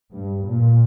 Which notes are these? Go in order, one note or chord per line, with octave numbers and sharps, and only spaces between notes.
G2
A#2